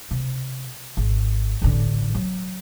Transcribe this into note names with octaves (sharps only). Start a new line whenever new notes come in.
C3
G#1
A1 D3
F#3